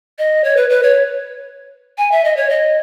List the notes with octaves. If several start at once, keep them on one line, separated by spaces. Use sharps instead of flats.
D#5
C#5
B4
B4
C#5
G#5
E5
D#5
C#5
D#5